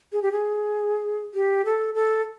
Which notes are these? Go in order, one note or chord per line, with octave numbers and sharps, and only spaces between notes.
G#4
G4
G#4
G4
A4
A4